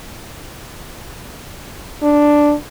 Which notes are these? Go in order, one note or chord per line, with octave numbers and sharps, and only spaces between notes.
D4